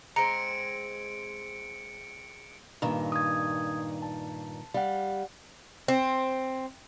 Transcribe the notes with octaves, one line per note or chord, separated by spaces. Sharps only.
G#3 C4 A#5 C#7 D7
G2 A#2 D#3
D#6 G#6
A5
G3 F5 F#5
C4